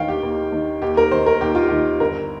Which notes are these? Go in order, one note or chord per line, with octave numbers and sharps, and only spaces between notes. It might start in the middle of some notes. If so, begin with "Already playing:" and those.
Already playing: D#2 D#3 F5 G5
G4
D#2
D#3
D#2 G4
A#4
D#3 C5
A#4
D#2 G4
F4
D#3 G4
G1 A#4